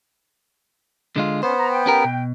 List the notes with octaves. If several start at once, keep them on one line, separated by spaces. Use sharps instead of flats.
D3 G#3 F4
B3 C#4 C5
A#5
G5
C#4 G4 A#4
B2